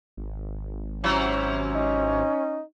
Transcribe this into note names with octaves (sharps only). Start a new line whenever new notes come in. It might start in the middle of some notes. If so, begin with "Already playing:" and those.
G#1
C3 F#3 C#4 E4
D#4